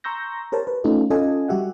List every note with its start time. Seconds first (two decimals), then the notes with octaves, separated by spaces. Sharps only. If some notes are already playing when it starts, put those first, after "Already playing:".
0.04 A#5 C6 C#6 E6 G6 A#6
0.52 G4 A#4 C5 C#5 A5
0.67 B4
0.84 A3 C#4 D#4 F4 A4
1.10 C#4 F4 A4 D#5 G#5
1.48 G3 F#4 G4 E5 F#5